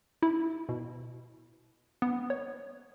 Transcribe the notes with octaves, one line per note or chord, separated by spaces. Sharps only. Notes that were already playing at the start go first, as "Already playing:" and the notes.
E4
B2
B3
C#5